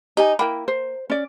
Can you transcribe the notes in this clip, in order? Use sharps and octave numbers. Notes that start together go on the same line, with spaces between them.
D#4 G4 G#5
A#3 E4 G5 B5
C5
C#4 D5